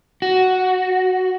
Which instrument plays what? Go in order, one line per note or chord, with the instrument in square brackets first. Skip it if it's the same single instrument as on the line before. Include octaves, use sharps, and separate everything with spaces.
[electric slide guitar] F#4